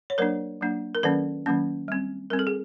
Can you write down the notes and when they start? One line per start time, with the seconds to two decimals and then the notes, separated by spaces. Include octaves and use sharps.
0.10 C#5
0.18 F#3 A#3 D4 A#4 C5
0.61 F#3 A#3 D4
0.95 A#4
1.03 D#3 F#3 A#3 C#4 A4 B4
1.46 D#3 F#3 A#3 C#4
1.88 G3 C4
2.30 G3 C4 A#4
2.39 A4
2.47 G#4